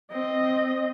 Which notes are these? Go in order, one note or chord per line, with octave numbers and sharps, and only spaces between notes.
C4 D#5